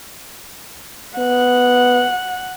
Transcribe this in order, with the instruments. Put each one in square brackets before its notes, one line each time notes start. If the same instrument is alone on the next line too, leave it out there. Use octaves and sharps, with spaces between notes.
[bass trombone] B3 [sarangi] F#5